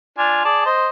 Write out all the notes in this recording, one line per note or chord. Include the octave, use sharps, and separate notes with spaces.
D4 F4 G#5
G#4 D5 A5
C5 D#5